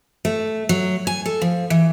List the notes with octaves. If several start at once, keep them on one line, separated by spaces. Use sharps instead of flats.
A3
F#3
G#5
A4
F3
E3